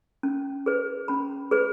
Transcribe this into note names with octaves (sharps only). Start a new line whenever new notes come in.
C#4
G#4 B4
C#4 B5
G#4 B4